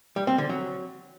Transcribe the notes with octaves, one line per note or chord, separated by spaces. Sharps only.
G3
C4
D3
F#3